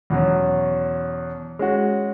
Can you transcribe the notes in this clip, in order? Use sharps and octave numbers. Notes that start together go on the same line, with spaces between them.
E2 B2 F#3 C#4
G#3 C#4 F#4